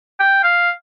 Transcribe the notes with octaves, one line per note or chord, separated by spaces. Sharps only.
G5
F5